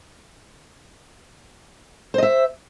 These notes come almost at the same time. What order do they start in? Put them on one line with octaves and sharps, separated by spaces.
C5 D#5 E5